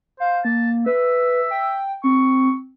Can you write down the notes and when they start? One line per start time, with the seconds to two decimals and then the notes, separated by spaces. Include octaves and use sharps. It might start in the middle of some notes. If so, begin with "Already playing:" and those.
0.20 C5 F5
0.45 A#3 A5
0.86 B4 E5
1.51 G5
2.04 C4 C#6